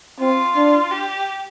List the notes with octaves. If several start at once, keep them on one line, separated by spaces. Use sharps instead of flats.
C4 F4
D4
G4